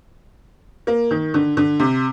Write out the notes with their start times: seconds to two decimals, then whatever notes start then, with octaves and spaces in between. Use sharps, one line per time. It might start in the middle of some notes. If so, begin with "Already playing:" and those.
0.87 A#3
1.11 D#3
1.34 D3
1.57 D3
1.79 C3